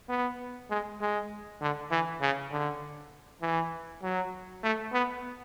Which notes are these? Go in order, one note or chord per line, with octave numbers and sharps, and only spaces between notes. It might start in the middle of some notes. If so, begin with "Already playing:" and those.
B3
G#3
G#3
D3
E3
C#3
D3
E3
F#3
A3
B3